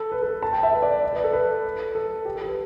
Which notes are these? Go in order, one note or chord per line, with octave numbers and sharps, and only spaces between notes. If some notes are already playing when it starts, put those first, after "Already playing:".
Already playing: A4
B4
A4
A5
G5
E5
B4
D5
D5
B4
A4
B4
A4
G4
A4
B4